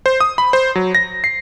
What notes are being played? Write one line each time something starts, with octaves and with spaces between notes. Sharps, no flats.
C5
D#6
B5
C5
F#3
A#6
C7